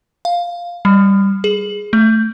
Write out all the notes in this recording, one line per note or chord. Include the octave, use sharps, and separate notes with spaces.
F5
G3
G#4
A3